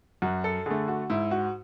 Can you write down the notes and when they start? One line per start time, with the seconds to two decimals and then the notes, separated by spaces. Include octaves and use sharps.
0.22 F#2 F#4
0.44 A4
0.66 D3 A3 G#4
0.88 F#4
1.10 G#2 E4
1.31 F#4